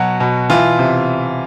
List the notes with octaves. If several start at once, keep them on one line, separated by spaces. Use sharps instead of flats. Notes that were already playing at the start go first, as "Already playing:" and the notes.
Already playing: B2 F#3 F#4
B2
E3 F4
C3